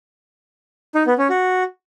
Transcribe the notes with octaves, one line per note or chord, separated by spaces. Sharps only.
D#4
B3
C#4
F#4